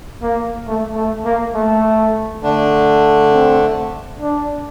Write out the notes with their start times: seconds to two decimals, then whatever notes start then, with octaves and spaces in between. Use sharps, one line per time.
0.22 A#3
0.66 A3
0.95 A3
1.25 A#3
1.54 A3
2.42 D3 A3 D4
3.31 C4
4.19 D4